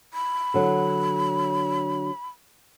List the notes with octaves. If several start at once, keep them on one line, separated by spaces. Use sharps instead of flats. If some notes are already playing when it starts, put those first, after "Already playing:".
B5
D3 F#3